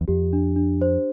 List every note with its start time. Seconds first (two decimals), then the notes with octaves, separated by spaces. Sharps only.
0.01 E2
0.08 F2 G4
0.33 D4
0.56 D4
0.81 C5